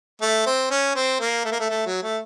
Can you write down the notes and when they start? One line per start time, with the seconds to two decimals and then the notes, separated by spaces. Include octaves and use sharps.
0.21 A3
0.46 C4
0.71 C#4
0.95 C4
1.20 A#3
1.45 A3
1.52 A#3
1.60 A3
1.70 A3
1.86 F#3
2.03 A3